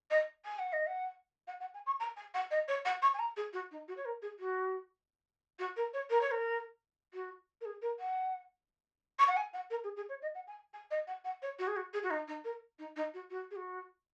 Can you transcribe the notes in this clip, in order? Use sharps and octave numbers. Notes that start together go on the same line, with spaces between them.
D#5
G#5
F#5
D#5
F#5
F#5
F#5
G#5
C#6
A#5
G#5
F#5
D#5
C#5
F#5
C#6
G#5
A#5
G#4
F#4
D#4
F#4
C#5
A#4
G#4
F#4
F#4
A#4
C#5
A#4
C#5
A#4
F#4
A#4
G#4
A#4
F#5
C#6
F#5
G#5
F#5
A#4
G#4
G#4
C#5
D#5
F#5
G#5
G#5
D#5
F#5
F#5
C#5
F#4
G#4
F#4
G#4
F#4
D#4
D#4
A#4
D#4
D#4
F#4
F#4
G#4
F#4